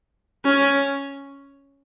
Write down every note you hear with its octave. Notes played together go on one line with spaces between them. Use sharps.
C#4